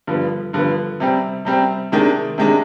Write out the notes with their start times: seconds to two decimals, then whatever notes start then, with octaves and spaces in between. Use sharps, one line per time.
0.07 G2 D3 F3 B3
0.53 G2 D3 F3 B3
1.00 C3 G3 C4
1.45 C3 G3 C4
1.92 C3 D#3 G#3 D4
2.38 C3 D#3 G#3 D4